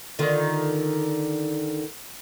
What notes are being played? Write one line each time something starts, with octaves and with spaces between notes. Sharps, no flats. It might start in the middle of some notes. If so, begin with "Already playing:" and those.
D3 D#3 F4